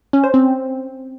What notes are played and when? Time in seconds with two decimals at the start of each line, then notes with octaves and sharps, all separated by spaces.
0.13 C#4
0.24 C5
0.34 C4